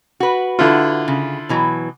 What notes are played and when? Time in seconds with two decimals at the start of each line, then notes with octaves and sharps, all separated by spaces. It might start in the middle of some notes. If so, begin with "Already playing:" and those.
0.20 F#4 B4
0.59 D3 E4 F4
1.08 C#3
1.49 B2 E3 F#3